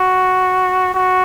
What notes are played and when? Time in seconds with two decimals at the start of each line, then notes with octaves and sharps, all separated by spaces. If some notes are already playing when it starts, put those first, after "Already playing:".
Already playing: F#4
0.94 F#4